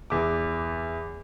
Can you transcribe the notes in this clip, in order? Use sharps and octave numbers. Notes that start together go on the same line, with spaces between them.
E2 D6